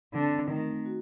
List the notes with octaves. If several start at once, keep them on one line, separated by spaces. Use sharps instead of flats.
D3 C4
D#3 A3
F#4